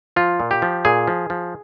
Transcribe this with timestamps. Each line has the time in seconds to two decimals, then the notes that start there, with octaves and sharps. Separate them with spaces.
0.16 F3 F4
0.40 A#2
0.51 G4
0.62 F3
0.85 A#2 G#4
1.07 F3
1.30 F3